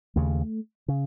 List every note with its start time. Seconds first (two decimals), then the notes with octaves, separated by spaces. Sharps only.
0.16 D#2 C#3 A3
0.88 C#3